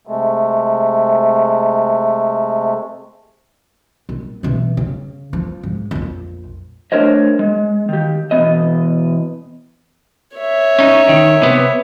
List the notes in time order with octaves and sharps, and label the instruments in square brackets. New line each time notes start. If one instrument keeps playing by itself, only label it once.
[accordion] C3 G#3 A3
[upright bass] A#1
B2 E3
C#3
F3
G#2
A#1 F2
[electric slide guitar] A3 D4 A#4 C5 C#5 D#5
G#3
D#3 G4
B2 E3 B3 D#5
[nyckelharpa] C#5 E5
[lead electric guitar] C#4 D#4
D#3
C3 B3